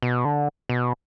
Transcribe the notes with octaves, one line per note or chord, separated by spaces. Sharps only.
B2
D3
B2